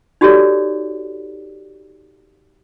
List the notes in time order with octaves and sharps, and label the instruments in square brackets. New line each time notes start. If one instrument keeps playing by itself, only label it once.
[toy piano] D#4 F#4 G4 A4 C#5 D5